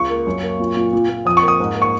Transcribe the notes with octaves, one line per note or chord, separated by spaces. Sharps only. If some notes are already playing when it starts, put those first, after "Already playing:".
Already playing: C#2 C#6
A#3
F#2
A#3
A#2
A#2
A#2
A#2
F2 D#6
C#6
A#3
D#6
G#2
A#3
C#6